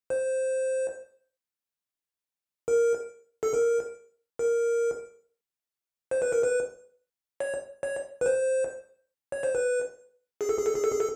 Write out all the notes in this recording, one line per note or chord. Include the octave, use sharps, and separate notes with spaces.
C5
A#4
A4
A#4
A#4
C5
B4
A#4
B4
C#5
C#5
B4
C5
C#5
C5
B4
G#4
A4
G#4
A4
G#4
A4
G#4
A4